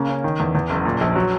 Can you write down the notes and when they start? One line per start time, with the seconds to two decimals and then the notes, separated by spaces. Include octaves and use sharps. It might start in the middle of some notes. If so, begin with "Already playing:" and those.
Already playing: C#3 A#3
0.09 C#4
0.24 D#3
0.40 E2
0.55 E2
0.70 F#1
0.85 A#2
1.01 A#1
1.15 F#3